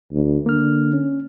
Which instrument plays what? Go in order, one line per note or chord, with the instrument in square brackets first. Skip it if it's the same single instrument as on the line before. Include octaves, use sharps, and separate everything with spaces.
[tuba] D2
[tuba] D3 [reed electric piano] A#3 F6
[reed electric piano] C#4